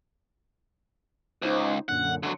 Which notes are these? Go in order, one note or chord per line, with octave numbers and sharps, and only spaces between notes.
C#2 D#4 C5
F#2 A#2 D3 F#5
D3 F#3 C6